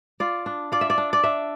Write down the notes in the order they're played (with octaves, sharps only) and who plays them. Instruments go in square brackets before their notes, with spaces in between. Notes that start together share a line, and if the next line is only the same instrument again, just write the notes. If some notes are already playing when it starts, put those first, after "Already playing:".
[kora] F4 D5
D4
F4 D5
E5
D5
D4
D5
D4 E5